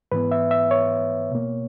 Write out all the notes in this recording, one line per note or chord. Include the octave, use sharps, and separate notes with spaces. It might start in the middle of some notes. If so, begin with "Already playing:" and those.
G#2 E3 B3 B4
E5
E5
C#5
B2 A#3